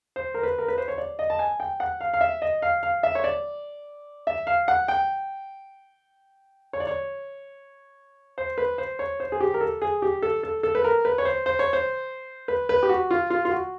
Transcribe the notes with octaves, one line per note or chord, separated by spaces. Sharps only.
C5
A#4
B4
A#4
B4
C5
C#5
D5
D#5
A5
G#5
G5
F#5
F5
F5
E5
D#5
F5
F5
E5
C#5
D5
E5
F5
F#5
G5
C#5
D5
C#5
C5
B4
C5
C#5
C5
G#4
G4
A#4
A4
G#4
G4
A4
A4
A4
B4
A#4
B4
C#5
C5
C5
C#5
C5
B4
B4
G4
F#4
F4
F4
F4
F#4